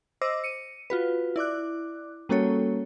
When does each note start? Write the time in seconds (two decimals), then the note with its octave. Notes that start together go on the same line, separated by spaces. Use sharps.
0.21 C5 D#5 D6 E6 A#6
0.44 C#7 D#7
0.90 F4 F#4 B4
1.36 E4 D5 D6 F#6
2.29 G3 A#3 C#4 F#4 A4 C#5